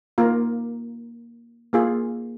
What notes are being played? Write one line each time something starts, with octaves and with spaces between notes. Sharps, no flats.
A#3 F4 A#4
A#3 F4 G#4